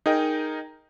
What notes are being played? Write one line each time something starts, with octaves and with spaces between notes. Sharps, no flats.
D#4 G#4 A#4 D#5 G5